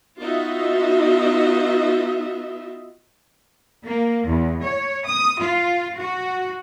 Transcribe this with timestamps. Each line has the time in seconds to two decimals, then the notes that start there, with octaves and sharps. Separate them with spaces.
0.21 B3 D#4 F4 F#4 D#5 E5
3.86 A#3
4.26 E2
4.63 C#5
5.05 D#6
5.42 F4
5.98 F#4